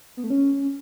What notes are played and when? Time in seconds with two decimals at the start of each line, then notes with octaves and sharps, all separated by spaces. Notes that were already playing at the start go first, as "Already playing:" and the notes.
0.17 B3
0.24 A3
0.30 C#4